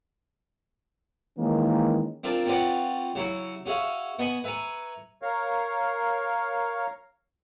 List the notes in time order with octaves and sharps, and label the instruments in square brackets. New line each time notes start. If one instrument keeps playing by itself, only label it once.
[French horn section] D#3 E3 G#3 A#3 C#4
[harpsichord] C4 D4 F4 A#4 D5
C4 C#4 F4 B4 D5 F#5
C#3 F#3 E4 F#4
C#4 F#4 G#4 E5 F5
B3 D#5 G#5 B5 C#6
B4 E5 G#5 A#5 C#6
[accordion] A#4 C#5 F5